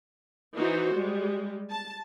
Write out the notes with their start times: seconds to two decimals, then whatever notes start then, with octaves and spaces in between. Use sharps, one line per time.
0.56 E3 D#4 F#4 C5
0.93 G3 G#3
1.70 A5